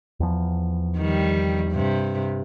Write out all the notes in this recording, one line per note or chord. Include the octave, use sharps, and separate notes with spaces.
E2 F3
D#3 G3
G2 C3